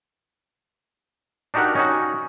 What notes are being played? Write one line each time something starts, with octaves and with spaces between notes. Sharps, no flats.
D4 D#4 F#4 G4 A#4 F#5
C#4 D#4 F#4